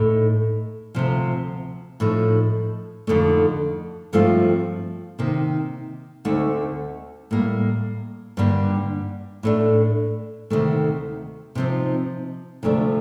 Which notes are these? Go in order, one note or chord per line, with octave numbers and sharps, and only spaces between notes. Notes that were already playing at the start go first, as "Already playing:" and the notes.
Already playing: A2 A3 D#4
D2 C3 F3
A2 F3 A3 D#4
F2 D3 A3 D#4
G2 F3 A3 C4 F4
C3 D#3 A#3
D2 D3 A3 C4 D#4
A2 G3 A#3
G2 D3 G3 A#3 D4
A2 A3 D4
D2 C3 D#3 A3
C3 F3 C4 D#4
D2 C3 F3 A3 D4